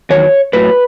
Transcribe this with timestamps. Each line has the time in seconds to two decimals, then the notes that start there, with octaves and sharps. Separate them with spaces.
0.10 E2 D#3 F#3 C#5
0.53 A2 F#3 B4